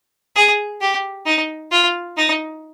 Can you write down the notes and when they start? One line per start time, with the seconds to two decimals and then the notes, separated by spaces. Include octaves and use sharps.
0.36 G#4
0.81 G4
1.25 D#4
1.71 F4
2.17 D#4